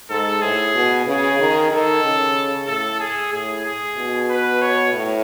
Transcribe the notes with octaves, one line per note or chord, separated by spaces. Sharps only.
G#2 A4
A2 G#4
B2
C#3 G#4
D#3
D#3 A4
C#3
A2 A4
G#4
A2 G#4
G#4
B2
B4
C#5
A2